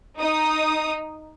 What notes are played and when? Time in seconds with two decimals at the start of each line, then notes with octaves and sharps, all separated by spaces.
0.19 D#4 D#6